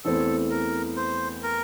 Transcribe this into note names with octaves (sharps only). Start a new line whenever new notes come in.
E2 E3 A3 C4 A4
A#4
C5
A#4